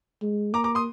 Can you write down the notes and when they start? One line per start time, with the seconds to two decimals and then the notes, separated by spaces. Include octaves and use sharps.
0.22 G#3
0.53 A#3 A#5 D6
0.64 A#5 D6
0.75 C6 D#6